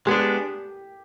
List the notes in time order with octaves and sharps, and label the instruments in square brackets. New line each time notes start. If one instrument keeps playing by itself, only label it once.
[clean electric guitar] G#3 B3 D4 [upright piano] G4